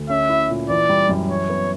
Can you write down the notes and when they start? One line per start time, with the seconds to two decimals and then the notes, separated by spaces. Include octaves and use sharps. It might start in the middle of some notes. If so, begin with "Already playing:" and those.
Already playing: D2
0.09 C#4 E5
0.29 E4
0.50 A#2
0.70 E3 D5
0.89 G3
1.09 F#2
1.29 E3 C#5
1.50 B3